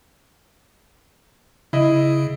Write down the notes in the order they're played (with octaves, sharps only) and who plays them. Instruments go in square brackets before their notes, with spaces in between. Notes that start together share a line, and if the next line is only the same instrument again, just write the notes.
[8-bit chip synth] C#3 [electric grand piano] E4 D#5